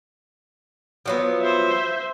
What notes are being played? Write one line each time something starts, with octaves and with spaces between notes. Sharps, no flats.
F3 F#3 B3
C5 E5